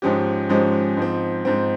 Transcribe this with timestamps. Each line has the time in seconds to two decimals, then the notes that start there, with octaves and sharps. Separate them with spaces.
0.02 G#2 F3 G#3 C#4 G4
0.49 G#2 F3 G#3 C#4 G4
0.97 G#2 F3 C4
1.45 G#2 F3 C4